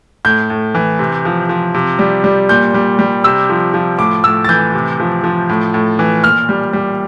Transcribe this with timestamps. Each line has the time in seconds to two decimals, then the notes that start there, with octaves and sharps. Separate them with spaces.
0.25 A2 G6
0.50 A2
0.75 E3
0.99 C3
1.25 F3
1.49 F3
1.74 C3
1.99 G3
2.24 G3
2.49 A#2 G6
2.74 G3
2.99 G3
3.24 C3 E6
3.49 F3
3.74 F3
3.99 A2 D6
4.24 A2 E6
4.44 A6
4.49 E3 G6
4.74 C3
5.00 F3
5.24 F3
5.49 A2
5.74 A2
5.99 E3
6.24 A#2 F6
6.49 G3
6.73 G3